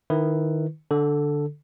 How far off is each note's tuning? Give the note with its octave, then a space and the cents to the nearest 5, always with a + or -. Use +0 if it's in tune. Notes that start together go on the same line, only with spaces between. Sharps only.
D#3 -15 E4 +0 B4 +0
D3 +0 A4 +0